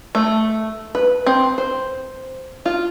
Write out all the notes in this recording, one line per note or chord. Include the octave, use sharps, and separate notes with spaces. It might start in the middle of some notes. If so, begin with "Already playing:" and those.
A3
B4
C4
C5
F4